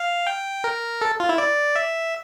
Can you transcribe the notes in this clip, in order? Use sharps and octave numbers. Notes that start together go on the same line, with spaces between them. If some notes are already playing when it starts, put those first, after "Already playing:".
Already playing: F5
G5
A#4
A4
F4
E4
D5
E5